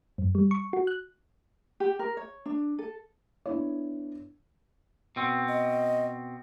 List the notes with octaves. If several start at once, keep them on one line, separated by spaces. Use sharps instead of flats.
F#2
G3
C#6
F#4
F#6
G4
A#4
C#5
D4
A4
B3 D4 E4 C#5
B2 C4
D#5